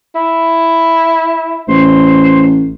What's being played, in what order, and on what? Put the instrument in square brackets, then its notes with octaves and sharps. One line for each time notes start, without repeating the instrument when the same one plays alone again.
[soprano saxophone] E4
[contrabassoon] A1 [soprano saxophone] C5